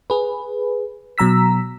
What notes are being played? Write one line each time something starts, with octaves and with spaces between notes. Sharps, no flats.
G#4 B4
B2 F#3 A#5 E6 B6